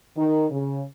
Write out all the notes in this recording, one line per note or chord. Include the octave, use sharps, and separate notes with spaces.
D#3
C#3